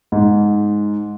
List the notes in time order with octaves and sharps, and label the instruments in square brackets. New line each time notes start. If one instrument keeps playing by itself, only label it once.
[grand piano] G#2